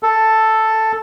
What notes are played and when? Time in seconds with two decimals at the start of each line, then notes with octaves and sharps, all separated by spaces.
0.03 A4